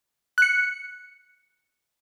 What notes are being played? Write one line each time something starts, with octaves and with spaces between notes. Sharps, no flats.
F#6 C#7